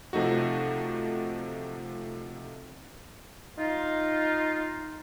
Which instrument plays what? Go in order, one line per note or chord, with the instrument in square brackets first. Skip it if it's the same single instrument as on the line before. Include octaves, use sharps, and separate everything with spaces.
[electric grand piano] C3 F3 A3 D#4 F#4
[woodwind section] D#4 F4